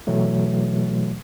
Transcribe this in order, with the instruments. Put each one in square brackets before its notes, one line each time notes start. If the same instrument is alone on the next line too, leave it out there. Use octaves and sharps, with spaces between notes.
[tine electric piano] B2 E3 F#3 A3